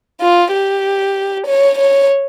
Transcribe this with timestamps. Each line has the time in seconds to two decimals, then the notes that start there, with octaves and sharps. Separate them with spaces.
0.21 F4
0.53 G4
1.46 C#5
1.78 C#5